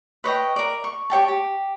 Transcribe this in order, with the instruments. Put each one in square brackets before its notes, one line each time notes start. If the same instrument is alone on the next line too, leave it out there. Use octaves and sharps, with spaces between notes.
[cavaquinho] B4 C#5 D#5 G5
A#4 D5
C#6
G4 C#5 G5 A5
G4